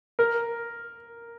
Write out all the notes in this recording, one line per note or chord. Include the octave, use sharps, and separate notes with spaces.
A#4